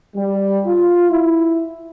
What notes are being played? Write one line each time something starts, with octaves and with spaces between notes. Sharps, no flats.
G3
F4
E4